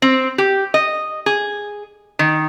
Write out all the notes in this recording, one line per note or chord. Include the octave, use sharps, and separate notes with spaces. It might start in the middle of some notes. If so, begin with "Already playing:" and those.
C4
G4
D#5
G#4
D#3